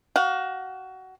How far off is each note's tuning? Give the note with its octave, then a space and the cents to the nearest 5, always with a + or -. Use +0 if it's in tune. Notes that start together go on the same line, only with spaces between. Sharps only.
F#4 +25 F5 +35